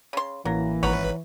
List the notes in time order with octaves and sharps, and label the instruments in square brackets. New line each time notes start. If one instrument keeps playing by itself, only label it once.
[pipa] C#3 C6
[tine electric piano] A1 A#3 A#6 [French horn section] E3 [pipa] F#3
[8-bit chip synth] G#1 B4 [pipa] C#5 F#5 A#5